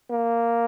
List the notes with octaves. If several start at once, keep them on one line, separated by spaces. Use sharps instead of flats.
A#3